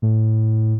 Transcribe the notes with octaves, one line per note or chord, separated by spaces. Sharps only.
A2